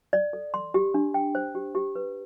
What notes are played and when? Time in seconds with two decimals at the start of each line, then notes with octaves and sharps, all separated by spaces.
0.13 D5
0.33 A4
0.54 C6
0.74 G4
0.94 D4
1.14 G5
1.35 C5
1.55 G4
1.75 G4
1.96 B4